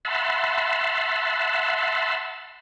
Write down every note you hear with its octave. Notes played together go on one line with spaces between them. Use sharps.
E5 F#5 A5 B5 C6